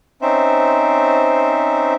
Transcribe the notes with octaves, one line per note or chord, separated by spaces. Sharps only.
C4 C#4 D#4 C5 E5